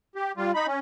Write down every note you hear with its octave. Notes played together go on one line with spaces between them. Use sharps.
G4
G3 F4
D#4 B5
C#4